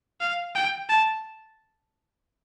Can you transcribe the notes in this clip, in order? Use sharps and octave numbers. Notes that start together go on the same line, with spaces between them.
F5
G5
A5